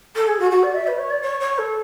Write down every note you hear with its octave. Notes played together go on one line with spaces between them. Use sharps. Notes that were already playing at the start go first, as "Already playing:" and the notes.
A4
G#4
F#4
F#4
D5
E5
B4
C#5
D5
C#5
C#5
A4